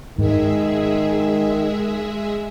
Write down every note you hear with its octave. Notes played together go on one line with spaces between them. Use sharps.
G#2 D#3 G#3 G#4 E5